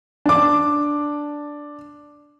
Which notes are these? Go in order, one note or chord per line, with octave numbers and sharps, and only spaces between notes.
D4 D6